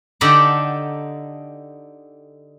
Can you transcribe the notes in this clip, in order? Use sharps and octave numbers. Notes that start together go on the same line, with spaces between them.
D3 D#4 G4 A4 D5 F#5